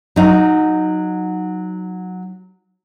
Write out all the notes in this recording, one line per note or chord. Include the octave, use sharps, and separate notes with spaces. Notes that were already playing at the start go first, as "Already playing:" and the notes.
F#3 D#4